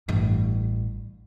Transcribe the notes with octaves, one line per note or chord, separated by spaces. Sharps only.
A1 G2